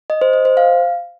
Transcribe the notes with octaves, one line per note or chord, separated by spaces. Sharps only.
D#5
C5
D#5
C5
F5